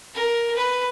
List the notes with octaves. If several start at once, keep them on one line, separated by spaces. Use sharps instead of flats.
A#4
B4